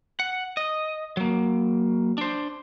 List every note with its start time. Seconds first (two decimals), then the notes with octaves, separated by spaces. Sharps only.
0.20 F#5
0.57 D#5
1.17 F#3 A#3
2.18 D4 C5